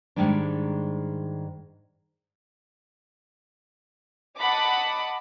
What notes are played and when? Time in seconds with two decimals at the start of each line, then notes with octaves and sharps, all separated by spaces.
0.16 G#2 B2 D#3 G3 G#3 D4
4.37 D#5 F#5 A5 B5 D6